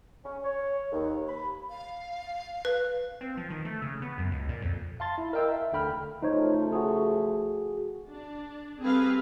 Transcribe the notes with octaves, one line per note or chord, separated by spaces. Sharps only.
C#4
C#5
D#2
B5
F5
B4
C4
F3
D#3
A3
C#3
B3
F#2
C#2
A#2
F2
F5 A5 C6 A6
E4
A#4 D#5 F5 G5 E6
E5
D2 D3 G5 B5 F6
C#3 F3 A3 D#4 C5 C#5
F#4 G#4
D4
G3 C4 G#4 A4 B4 F5